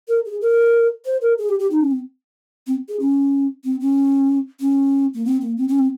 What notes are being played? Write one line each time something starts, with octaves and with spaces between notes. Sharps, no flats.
A#4
G#4
A#4
C5
A#4
G#4
G4
G4
D#4
C#4
C4
C4
G#4
C#4
C4
C#4
C#4
A#3
C4
A#3
C4
C#4
C4